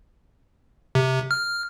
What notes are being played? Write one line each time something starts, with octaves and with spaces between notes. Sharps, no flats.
C3
F6